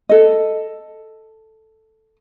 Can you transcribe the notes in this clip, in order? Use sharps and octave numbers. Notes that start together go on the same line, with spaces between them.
A4 D#5